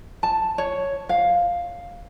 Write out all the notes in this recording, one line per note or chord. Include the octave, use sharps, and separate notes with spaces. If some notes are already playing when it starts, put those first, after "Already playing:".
A5
C#5
F5